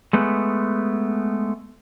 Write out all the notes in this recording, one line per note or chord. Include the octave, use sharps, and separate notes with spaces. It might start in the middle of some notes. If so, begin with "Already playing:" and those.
G#3 A3 B3